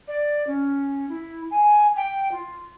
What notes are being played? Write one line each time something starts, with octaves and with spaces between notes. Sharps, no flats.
D5
C#4
E4
G#5
G5
F4